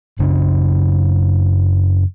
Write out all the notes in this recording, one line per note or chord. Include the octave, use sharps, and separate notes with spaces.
F#2 C#3 D4